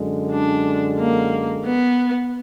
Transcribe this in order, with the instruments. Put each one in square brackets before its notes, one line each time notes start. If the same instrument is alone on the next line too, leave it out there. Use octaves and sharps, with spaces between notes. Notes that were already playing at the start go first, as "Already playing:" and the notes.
Already playing: [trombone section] F#2 D3 G#3
[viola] D4
A#3
B3